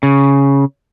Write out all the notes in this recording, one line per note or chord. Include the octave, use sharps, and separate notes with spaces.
C#3